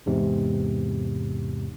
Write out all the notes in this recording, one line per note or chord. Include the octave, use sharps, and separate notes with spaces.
E2 G#2 C3